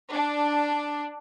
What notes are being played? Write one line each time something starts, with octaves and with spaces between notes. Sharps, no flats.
D4